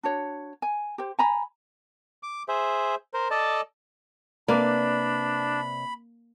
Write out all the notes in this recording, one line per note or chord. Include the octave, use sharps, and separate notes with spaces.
D4 F#4 C#5
G#5
G4 C5
G#5 A#5 B5
D6
G#4 C5 E5
A#4 C5
A4 D5 D#5 A5
C3 A#3 D4 B4 D5 B5